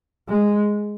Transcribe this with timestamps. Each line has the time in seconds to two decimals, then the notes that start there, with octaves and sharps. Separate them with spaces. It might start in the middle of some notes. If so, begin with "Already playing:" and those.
0.29 G#3